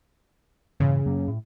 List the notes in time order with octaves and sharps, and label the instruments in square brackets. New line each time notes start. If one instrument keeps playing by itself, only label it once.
[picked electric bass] G2 A#2 E3 [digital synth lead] C#3
[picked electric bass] F#2 F#3 A#3
A2